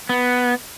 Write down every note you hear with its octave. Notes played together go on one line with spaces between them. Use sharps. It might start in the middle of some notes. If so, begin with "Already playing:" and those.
B3